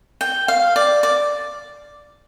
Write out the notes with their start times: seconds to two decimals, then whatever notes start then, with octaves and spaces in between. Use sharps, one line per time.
0.21 G5
0.48 F5
0.76 D5
1.03 D5